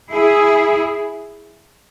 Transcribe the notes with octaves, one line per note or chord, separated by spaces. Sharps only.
E4 G#4